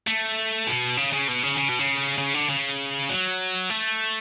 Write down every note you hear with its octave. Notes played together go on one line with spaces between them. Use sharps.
A3
B2
C#3
C#3
B2
C#3
C#3
B2
C#3
C#3
D3
C#3
F#3
A3